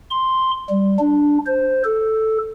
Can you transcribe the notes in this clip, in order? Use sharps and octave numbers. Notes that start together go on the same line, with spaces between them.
C6
G3
D4
C5
A4